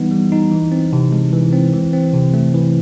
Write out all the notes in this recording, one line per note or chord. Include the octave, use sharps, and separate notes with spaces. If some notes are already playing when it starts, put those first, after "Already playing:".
Already playing: E3 G3 B3 D#4
G3
D#4
E3
C4
C3
G#3
E3
C4
E3
C4
C3
A3
E3